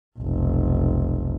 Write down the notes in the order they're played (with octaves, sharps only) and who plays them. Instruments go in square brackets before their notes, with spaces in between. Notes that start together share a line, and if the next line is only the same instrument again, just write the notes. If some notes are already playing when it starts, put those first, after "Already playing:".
[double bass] F1 B1